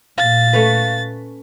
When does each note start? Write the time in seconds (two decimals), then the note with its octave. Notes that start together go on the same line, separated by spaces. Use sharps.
0.18 A#2 F5 A6
0.53 A3 C#4 B4